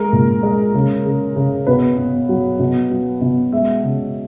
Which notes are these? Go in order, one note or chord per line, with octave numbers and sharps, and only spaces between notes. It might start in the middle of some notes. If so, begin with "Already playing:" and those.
Already playing: G#3 A#4
A#2
G#3
C#3
C#3
C#3
B2 B4
B2
F#3
B2
F#3
B2
G#3 E5
C#3